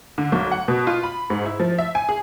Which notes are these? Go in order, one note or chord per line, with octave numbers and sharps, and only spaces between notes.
D3
B1
F#5
B2
F4
B5
G#2
E4
F3
E5
G#5
G#4